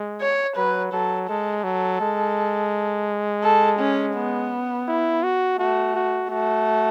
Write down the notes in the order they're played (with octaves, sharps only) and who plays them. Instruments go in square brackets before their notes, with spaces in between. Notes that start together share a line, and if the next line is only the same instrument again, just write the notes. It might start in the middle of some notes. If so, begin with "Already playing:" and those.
Already playing: [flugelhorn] G#3
[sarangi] C#5
[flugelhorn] F#3 [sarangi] B4
[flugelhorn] F#3 [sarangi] A4
[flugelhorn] G#3 [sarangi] A4
[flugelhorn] F#3 [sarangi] A4
[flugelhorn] G#3
[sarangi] A4
C#4
B3
[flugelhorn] E4
F#4
[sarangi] A3 [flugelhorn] F#4
[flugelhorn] F#4
[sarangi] A3 [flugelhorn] F#4